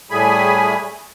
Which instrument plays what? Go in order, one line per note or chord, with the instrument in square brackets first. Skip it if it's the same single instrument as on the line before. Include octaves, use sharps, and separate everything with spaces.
[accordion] A2 G3 A3 G#4 G#5 B5